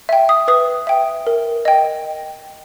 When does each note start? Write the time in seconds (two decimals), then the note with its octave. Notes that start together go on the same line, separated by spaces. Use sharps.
0.09 E5 G5
0.29 D#6
0.48 B4 D#6
0.87 E5 G5
1.27 A#4
1.65 D#5 G5